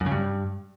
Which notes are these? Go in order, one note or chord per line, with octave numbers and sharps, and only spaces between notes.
F#2
C#3
G2